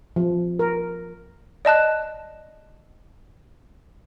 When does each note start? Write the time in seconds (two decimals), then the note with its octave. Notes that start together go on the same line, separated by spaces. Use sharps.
0.16 F3
0.59 A#4
1.65 D5 D#5 A5 F#6